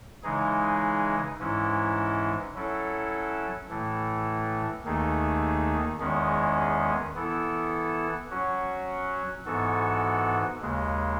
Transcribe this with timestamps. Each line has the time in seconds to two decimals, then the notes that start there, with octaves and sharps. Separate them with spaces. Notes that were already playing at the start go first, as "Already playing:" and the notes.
0.23 C#3 E3 G#3 D#4 G#4
1.39 G#2 E3 G#3 C#4 E4
2.54 F#3 C#4 E4 A4
3.70 A2 E3 A3
4.85 D#2 D#3 A3 D#4 G#4
6.00 E2 D#3 G#3 C#4 G#4
7.16 E3 B3 E4 A4
8.31 F#3 C#4 F#4
9.46 G#2 E3 B3 F#4 A4
10.62 D#2 C#3 G#3